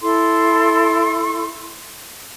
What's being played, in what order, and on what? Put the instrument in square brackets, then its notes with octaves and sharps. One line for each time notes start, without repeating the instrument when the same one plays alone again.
[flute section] E4 A4 C6